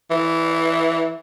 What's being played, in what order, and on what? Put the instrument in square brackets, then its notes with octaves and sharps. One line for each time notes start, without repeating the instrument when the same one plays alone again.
[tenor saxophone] E3